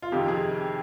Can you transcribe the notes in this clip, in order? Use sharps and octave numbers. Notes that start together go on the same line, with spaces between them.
F4
F2 C3 D#3 G4
G#4